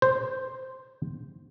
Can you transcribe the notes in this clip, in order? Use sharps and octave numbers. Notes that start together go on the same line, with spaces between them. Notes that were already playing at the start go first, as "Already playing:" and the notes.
C5